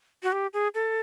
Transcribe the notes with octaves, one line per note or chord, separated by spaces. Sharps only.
F#4
G4
G#4
A4